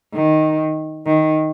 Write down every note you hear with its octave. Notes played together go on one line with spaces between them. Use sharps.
D#3
D#3